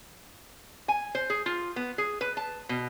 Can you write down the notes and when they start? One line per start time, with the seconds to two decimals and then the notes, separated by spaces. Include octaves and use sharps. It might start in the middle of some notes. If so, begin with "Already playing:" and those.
0.88 G#5
1.15 C5
1.30 G#4
1.46 F4
1.76 B3
1.98 G#4
2.21 B4
2.37 A5
2.69 B2